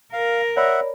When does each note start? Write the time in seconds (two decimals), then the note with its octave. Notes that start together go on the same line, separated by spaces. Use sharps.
0.13 A#4 F5
0.57 C#5 D5 E5 F#5 B5